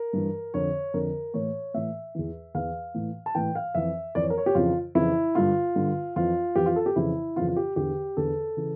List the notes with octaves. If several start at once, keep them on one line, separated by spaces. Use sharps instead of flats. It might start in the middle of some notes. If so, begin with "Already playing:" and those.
Already playing: A#4
G2 E3
F2 D3 C#5
F2 D3 A#4
A2 E3 C#5
A2 E3 E5
E2 E3
E2 E3 F5
A2 E3
A5
A2 E3 G5
F5
F2 E3 E5
F2 E3 D5
C#5
A#4
C#5
G4
F2 C#3 E3 F4
F2 C#3 E3 E4
G2 D3 F4
G2 D3
F2 E3 F4
F2 E3 G4
F4
A4
G4
F2 C#3 E3 E4
F2 C#3 E3 F4
F4
G4
E2 D3 G4
E2 D3 A4
C#3 E3